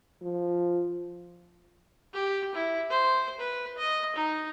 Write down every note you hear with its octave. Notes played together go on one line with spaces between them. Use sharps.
F3
G4
E4
C5
B4
D#5
D#4